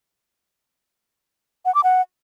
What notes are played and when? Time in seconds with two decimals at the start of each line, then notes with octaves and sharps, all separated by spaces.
1.65 F#5
1.75 D6
1.84 F#5